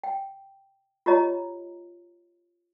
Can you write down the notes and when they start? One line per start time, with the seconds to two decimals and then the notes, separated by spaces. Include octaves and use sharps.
0.04 G5
1.06 F4 G4 C#5 D#5 A#5